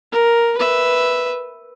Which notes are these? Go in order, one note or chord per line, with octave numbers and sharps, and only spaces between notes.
A#4
B4 E5